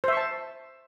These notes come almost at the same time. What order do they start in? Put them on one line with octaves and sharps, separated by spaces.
C5 E5 C#6 A5